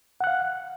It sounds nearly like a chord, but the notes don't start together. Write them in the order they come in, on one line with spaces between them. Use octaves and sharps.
F#5 F#6 F5